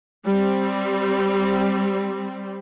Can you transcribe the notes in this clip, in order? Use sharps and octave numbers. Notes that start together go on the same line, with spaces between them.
G3 C4